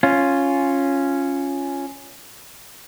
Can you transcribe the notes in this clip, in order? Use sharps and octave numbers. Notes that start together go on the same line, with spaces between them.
C#4 F4